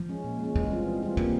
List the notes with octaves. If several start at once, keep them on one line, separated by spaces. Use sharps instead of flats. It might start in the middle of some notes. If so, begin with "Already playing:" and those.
Already playing: F3
G#3 C#4
A#2
G#3
C#4
E3 G#3
G3 C4 F4
E3
G3 C4 F4
C3 A#3